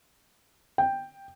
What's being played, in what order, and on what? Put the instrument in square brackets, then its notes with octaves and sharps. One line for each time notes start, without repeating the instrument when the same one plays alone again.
[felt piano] G5